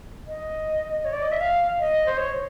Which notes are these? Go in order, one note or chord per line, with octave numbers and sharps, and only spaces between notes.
D#5
C#5
D5
D#5
E5
F5
D#5
C5
C#5